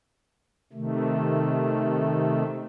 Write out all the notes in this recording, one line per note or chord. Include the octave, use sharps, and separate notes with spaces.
C3 D#3 A3